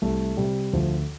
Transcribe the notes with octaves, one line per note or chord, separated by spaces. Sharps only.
C2 A3
C3 G3
D2 F3